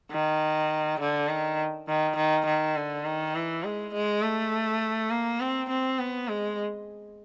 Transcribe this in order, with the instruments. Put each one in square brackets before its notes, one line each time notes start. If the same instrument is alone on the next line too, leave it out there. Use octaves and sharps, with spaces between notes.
[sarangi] D#3
D3
D#3
D#3
D#3
D#3
D3
D#3
E3
G#3
G#3
A3
A#3
C4
C4
B3
G#3